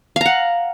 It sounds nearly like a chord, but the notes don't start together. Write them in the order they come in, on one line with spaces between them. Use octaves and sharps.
F5 A#5 F#5